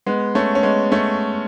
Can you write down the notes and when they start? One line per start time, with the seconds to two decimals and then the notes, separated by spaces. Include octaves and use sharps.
0.06 G#3 B3
0.35 A3 C#4
0.55 C#4
0.63 G#3 B3
0.92 A3 C#4